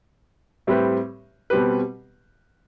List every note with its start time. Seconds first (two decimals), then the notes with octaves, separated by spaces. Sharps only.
0.67 A2 G3 C4 G4 B4
1.50 B2 G3 C4 G4 B4